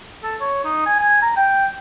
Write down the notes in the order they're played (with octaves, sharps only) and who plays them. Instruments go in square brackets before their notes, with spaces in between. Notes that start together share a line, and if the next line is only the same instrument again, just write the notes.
[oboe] A4
C#5
D#4
G#5
G#5
A#5
G5